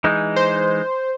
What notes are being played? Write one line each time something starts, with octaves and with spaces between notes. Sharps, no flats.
E3 G#3 D#4
C5